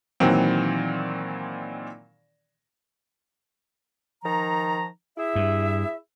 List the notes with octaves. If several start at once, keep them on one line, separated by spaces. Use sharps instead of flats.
A#2 D#3 E3 F#3 C4
D#3 F3 A#5
E4 G#4 E5
G2